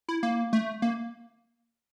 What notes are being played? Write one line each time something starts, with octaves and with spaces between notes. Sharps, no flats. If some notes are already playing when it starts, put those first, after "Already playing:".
E4
A#3
A3
A#3